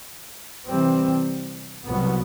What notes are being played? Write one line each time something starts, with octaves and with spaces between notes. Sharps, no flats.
C3 E3 G3 C4
C2 B2 F#3 B3